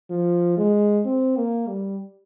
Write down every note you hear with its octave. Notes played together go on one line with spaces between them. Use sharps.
F3
G#3
C4
A#3
G3